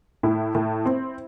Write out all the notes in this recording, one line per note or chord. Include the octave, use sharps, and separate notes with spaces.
A2 E4
A2
C4